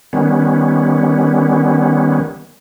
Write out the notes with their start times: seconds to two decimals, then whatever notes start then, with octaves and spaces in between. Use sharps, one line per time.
0.13 D#3 G3 B3 C#4